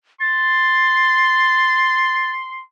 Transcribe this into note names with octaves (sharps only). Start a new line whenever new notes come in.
C6 A6